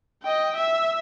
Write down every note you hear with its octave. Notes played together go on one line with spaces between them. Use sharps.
D#5 G5
E5